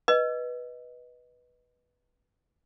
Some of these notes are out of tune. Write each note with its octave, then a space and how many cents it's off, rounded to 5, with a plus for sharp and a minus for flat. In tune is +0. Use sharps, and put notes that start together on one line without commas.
B4 -10 D#5 +0